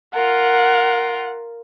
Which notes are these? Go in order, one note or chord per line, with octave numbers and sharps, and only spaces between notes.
F4 A#4 F#5